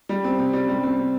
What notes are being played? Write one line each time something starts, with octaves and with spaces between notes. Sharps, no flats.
G3
C4
C3
G3
G3
C4
C3